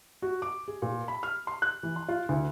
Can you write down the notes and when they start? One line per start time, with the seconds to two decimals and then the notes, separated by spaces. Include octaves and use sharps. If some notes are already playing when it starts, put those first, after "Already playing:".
0.22 F#4
0.42 D6
0.68 G#4
0.82 A#2
1.08 B5
1.23 F6
1.47 C6
1.62 F#6
1.83 E3
1.96 C6
2.08 F4
2.29 D2